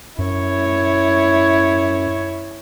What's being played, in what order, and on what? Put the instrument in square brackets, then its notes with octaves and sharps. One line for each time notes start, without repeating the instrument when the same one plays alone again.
[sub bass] F#2 [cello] E4 C#5